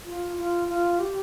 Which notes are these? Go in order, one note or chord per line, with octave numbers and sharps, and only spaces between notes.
F4
F4
F4
G4